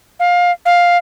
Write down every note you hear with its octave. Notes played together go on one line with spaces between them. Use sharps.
F5
F5